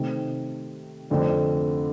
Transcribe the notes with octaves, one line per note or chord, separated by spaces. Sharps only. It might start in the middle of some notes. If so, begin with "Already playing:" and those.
Already playing: C3 D#3 A3 C4
F2 D3 A3 C4